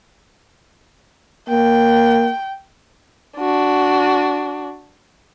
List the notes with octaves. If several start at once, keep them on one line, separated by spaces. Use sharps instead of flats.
A#3 G5
D4 F#4